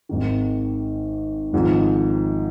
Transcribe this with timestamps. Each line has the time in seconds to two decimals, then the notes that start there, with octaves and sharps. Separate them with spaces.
0.09 G#1 G#2 D#3
1.53 G#1 G#2 F3